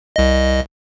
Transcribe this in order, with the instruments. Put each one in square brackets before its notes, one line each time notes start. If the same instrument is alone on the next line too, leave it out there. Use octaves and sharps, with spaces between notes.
[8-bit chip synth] C2 D#5